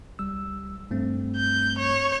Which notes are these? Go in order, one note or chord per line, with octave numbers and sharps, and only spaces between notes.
C2 G3 E6
G2 A3 C4
G6
C#5